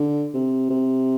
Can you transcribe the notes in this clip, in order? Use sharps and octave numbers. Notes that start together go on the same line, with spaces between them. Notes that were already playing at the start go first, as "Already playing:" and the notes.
Already playing: D3
C3
C3